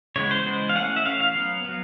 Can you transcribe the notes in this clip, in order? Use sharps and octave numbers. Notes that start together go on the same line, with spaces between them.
C#3 E3 G#3 B3 C#5
C5
C#3 E3 G#3 B3
F5
E3 A3 C#4 F#5
E5
E3 A3 C#4 F5
F5
F#3 B3
F#3 B3